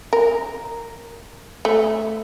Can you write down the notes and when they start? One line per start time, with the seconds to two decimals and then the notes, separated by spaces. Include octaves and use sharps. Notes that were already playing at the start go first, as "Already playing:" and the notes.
0.13 A#4
1.65 A3